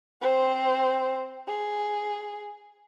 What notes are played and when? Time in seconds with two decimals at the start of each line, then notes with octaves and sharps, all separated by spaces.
0.21 C4 C5
1.48 G#4